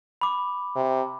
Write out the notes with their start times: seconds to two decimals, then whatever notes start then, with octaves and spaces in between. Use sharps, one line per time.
0.21 B5 D6
0.76 C3